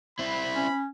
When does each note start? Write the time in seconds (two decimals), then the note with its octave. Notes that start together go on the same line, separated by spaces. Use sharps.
0.19 C4 E4 B5
0.55 C#4